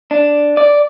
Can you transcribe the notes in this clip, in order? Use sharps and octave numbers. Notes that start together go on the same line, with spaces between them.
D4
D5